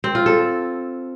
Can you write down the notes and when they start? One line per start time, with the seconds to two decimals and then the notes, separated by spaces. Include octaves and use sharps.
0.04 C4
0.15 F4
0.26 A4